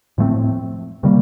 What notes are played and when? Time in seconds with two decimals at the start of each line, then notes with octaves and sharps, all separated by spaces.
0.18 A2 F3 A3 C4
1.03 C3 D#3 G3 A#3